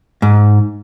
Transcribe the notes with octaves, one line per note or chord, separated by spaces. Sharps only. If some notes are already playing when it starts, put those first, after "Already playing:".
G#2